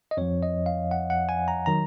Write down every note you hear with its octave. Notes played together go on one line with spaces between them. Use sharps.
D#5
F2 F3 C#5
D#5
F5
F#5
F#5
G#5
A#5
D#3 F#3 A#5